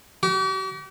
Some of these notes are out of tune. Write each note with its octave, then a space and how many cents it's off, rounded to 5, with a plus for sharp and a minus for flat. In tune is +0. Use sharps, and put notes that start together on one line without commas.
G4 -45